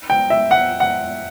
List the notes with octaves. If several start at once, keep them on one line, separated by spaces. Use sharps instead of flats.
G5
E5
F#5
F#5